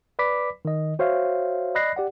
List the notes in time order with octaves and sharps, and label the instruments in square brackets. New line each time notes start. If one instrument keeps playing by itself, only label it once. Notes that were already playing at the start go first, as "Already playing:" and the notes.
[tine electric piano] B4 D5 B5 D6 B6
D#3 D#5
F#4 C5 C#5 E5 F5
D5 D#5 B5 F#6 A#6 C7
G4 D5 F#5